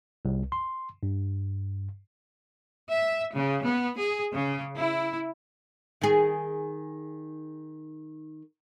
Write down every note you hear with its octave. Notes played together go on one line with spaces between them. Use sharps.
C2
C6
G2
E5
C#3
B3
G#4
C#3
E4
D#3 G#4